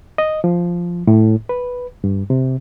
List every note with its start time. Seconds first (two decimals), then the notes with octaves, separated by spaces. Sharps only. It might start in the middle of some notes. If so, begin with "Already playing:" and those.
0.18 D#5
0.44 F3
1.07 A2
1.49 B4
2.04 G2
2.30 C3